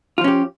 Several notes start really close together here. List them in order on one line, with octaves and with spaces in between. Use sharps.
F4 F3 C#4 G4